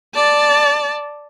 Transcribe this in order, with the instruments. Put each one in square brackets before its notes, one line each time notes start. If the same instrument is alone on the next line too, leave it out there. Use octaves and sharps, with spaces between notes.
[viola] D5 A5